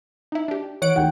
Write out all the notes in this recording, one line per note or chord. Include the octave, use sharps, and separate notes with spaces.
D#4 E4
D4 G4
E3 C#5 F#5 D7
A1 D#2 D#3 F#5 G5